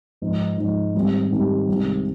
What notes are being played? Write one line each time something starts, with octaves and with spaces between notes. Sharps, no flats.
G#2 F3 G#3 D#4
G#2 F3 G#3 D#4
G#2 D#3 G3 C4 G4
G#2 D#3 G3 C4 G4
C2 C3 D#3 G#3